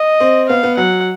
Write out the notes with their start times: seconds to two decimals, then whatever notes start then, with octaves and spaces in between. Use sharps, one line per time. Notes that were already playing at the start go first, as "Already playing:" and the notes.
Already playing: D#5
0.20 C4
0.48 B3 F5
0.63 B3
0.77 F#3 F#5